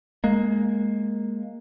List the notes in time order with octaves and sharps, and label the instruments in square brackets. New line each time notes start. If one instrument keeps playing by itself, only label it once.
[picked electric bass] G#3 A#3